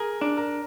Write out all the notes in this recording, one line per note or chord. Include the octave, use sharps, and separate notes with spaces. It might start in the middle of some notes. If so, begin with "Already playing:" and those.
Already playing: G#4 A#4
D4
A#4